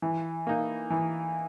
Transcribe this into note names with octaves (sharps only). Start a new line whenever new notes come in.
E3
A#3 D#4
E3